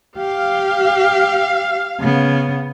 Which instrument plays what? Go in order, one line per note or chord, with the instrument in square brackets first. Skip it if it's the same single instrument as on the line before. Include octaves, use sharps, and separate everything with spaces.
[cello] G4 [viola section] F5
[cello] C#3 B3